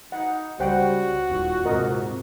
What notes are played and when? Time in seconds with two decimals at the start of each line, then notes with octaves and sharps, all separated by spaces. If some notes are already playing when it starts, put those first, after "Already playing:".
0.12 D#4 F#5
0.60 C#2 G3 F#4 C5 F#5 G5
1.30 D#1 D#2 A#2
1.65 G#2 C3 A#4 D#5